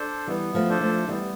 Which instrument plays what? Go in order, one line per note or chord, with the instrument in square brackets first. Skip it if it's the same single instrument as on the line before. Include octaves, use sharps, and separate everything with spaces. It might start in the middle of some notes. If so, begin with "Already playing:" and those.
Already playing: [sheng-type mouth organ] D4 A4 C5
[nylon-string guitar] E3 G3 [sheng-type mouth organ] B3
[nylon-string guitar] F3 A3
[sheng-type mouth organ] D4 A4 C5
[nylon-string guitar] F3 A3
[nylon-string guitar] E3 G3 [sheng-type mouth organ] B3